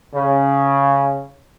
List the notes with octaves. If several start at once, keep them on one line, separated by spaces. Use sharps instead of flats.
C#3